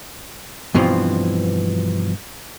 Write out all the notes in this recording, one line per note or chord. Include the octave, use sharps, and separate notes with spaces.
G2 B2 E3 F3 C4